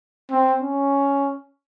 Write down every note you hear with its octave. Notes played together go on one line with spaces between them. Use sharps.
C4
C#4